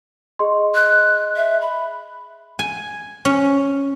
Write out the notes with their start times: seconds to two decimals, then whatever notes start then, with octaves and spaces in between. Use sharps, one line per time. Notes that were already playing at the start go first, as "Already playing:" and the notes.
0.39 G#4 D#5 C6
0.75 F#6
1.36 E5
1.61 B5
2.59 G#5
3.25 C#4